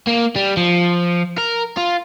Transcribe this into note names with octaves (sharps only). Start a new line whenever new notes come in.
A#3
G3
F3
A#4
F4